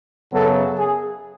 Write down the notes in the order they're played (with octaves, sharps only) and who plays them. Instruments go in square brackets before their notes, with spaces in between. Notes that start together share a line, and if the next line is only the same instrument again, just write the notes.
[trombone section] F#2 C#3 F#3 B3 A4
G#4